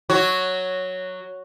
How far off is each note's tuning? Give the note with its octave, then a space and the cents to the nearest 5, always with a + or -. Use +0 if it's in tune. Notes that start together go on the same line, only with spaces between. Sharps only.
F#3 +0 F#4 +0 C#5 +0